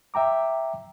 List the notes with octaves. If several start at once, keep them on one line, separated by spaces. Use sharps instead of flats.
E5 G5 A#5 D6